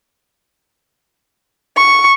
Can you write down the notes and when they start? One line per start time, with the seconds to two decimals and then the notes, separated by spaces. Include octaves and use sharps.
1.77 C#6